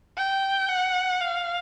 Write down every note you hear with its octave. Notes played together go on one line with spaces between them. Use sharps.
G5
F#5
F5